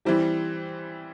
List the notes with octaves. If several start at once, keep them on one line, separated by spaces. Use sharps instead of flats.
E3 G3 C4 E4 G4